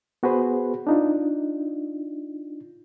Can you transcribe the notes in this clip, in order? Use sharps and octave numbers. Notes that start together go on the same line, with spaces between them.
B3 F#4 G#4 B4 C5
D4 D#4 F4